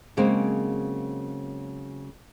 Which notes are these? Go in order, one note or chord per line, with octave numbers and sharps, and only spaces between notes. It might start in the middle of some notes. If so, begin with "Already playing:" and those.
C#3 F#3 G#3 A#3 C4